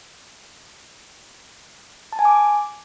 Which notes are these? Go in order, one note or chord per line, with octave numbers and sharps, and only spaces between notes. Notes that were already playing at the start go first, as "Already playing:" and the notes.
A5
G#5
D6